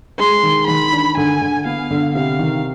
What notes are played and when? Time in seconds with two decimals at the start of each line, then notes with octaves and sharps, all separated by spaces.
0.19 G#3 C6
0.43 D#3
0.68 D#3 B5
0.92 D4
1.17 D3 G#5
1.41 D3
1.66 B3 F5
1.91 D3
2.15 C3 F5
2.39 D#3